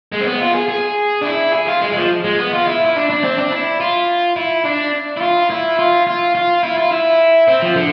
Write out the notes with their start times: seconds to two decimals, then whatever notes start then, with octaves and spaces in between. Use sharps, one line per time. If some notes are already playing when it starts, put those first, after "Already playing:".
0.12 G#3
0.21 C4
0.27 B3
0.41 F4
0.55 G#4
0.69 G#4
1.22 D4
1.26 E4
1.54 G#4
1.68 F4
1.82 G#3
1.92 G#3
1.96 F3
2.24 G#3
2.39 B3
2.53 F4
2.68 E4
2.85 E4
2.96 D4
3.10 D4
3.24 C4
3.38 D4
3.52 E4
3.80 F4
4.36 E4
4.65 D4
5.17 E4
5.21 F4
5.50 E4
5.79 F4
6.07 F4
6.35 F4
6.63 E4
6.78 F4
6.92 E4
7.48 C4
7.62 F3
7.76 D3